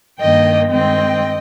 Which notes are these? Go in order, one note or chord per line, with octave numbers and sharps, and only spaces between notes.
G2 D#3 A#3 D#5 G5
G2 D#3 G#3 C4 D#5 G5